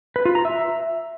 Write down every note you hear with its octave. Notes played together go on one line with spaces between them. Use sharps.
B4
F4
A#5
E5